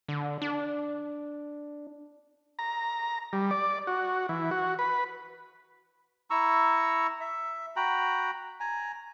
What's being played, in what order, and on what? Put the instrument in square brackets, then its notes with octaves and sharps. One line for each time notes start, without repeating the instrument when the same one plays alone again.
[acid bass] D3
D4
[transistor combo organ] A#5
G3
D5
F#4
E3
F#4
B4
[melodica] E4 A#5 C#6 E6
E5
F#4 G5 A#5 B5
G#5 A#5